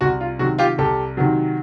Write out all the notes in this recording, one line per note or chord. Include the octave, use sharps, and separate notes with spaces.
C2 F#4
F4
C3 D#3 F#3 F#4
F4 G4
C2 G4 A4
C3 D#3 F#3